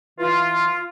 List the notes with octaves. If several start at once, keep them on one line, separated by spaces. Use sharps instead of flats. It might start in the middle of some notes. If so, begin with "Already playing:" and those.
E3 F4